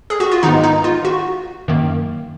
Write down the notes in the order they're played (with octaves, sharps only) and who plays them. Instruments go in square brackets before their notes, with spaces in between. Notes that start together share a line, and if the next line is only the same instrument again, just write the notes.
[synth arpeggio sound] G#4
F#4
F4
G#2 D#3 G#3 B3 D#4
D#4
F4
F#4
F#2 D#3 A#3